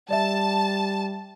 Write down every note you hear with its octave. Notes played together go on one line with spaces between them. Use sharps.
G3 D5 E5 A5